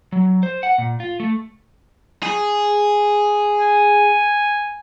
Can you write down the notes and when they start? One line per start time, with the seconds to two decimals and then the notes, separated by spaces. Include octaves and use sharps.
0.12 F#3
0.43 C5
0.63 F#5
0.78 A#2
1.00 F4
1.20 A3
2.23 G#4
3.60 G#5